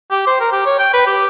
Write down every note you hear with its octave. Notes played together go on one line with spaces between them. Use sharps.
G4
C5
A#4
G4
C#5
G5
B4
G4